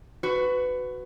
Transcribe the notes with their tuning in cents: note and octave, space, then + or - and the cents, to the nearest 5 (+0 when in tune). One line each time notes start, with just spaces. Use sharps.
F#4 +0 B4 +20